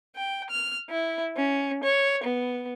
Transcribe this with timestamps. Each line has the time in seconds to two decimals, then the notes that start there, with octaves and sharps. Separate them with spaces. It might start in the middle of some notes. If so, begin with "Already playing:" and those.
0.16 G5
0.49 F6
0.89 E4
1.36 C#4
1.84 C#5
2.23 B3